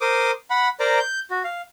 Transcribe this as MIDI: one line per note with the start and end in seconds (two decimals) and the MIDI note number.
0.01 0.31 70
0.01 0.31 72
0.01 0.31 86
0.01 0.31 87
0.50 0.69 78
0.50 0.69 83
0.80 0.99 70
0.80 0.99 72
0.80 0.99 74
0.80 0.99 82
0.80 0.99 86
0.99 1.20 91
1.31 1.42 66
1.44 1.62 77